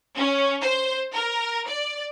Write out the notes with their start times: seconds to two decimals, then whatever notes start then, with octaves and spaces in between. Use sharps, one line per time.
0.16 C#4
0.62 C5
1.13 A#4
1.67 D5